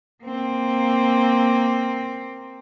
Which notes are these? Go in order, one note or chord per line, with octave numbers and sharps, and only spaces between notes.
A#3 C4